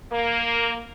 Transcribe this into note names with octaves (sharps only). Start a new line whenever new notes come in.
A#3